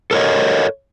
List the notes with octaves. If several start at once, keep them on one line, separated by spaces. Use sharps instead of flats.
A4 A#4 C#5 D#5